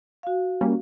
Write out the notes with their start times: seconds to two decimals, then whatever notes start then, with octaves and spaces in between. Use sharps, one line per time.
0.23 F#4 F5
0.61 G3 A#3 C#4